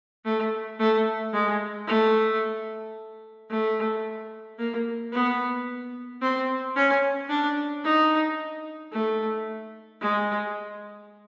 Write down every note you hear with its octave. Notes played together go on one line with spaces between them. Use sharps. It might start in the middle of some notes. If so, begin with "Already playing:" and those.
A3
A3
G#3
A3
A3
A#3
B3
C4
C#4
D4
D#4
A3
G#3